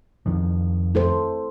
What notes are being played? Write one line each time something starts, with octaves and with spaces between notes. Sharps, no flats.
F2 D#3 F3
E4 A4 C5